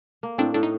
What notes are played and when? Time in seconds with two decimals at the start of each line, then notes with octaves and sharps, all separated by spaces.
0.23 A#3
0.38 A2 C4 D4
0.54 A2 D4
0.63 D#4